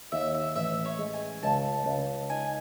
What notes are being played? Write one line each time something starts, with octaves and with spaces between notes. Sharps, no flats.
D#2 E5
E5
A1 E5
C#5
G#3
G#5
C#2 A5
C#2
D#4 G#5